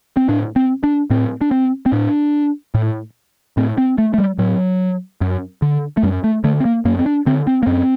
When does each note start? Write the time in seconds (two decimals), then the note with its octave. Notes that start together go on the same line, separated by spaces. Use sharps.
0.17 C4
0.29 A2 D4
0.56 C4
0.84 D4
1.10 A2 C4
1.41 D4
1.51 C4
1.86 C4
1.92 A2 D4
2.74 A2
3.57 A2 C4
3.78 C4
3.98 A3
4.14 A3
4.18 G3
4.38 A2 F#3
5.21 F#2
5.62 D3
5.97 A3
6.03 F#2 G3
6.24 A3
6.44 D3 A3
6.60 C4
6.65 A#3
6.85 F#2 A#3
6.99 C4
7.06 D4
7.26 D3 C4
7.47 C4
7.63 A#3
7.67 F#2 C4